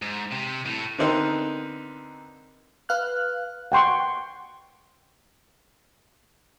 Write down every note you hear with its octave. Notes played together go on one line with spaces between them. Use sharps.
G#2
C3
A2
D3 B3 C4 D#4 A#4 C5
B4 F5 F6 F#6
F#5 G5 C6 C#6